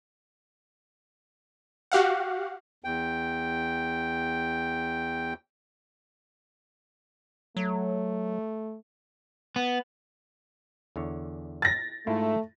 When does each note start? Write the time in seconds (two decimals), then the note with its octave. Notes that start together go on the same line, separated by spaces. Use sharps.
1.92 F#4 G4 F5 F#5
2.84 E2 G5
7.57 F#3 A3
9.56 B3
10.96 E2 D3 C#5
11.62 A6 A#6
12.07 G#2 A3 E4 F4